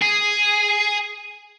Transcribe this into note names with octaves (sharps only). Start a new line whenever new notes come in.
G#4